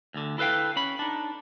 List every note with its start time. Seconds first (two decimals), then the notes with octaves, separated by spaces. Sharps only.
0.14 D2 D3
0.38 E4 A4 B4 F5 G5
0.76 C#4 B5
0.99 D4 D#4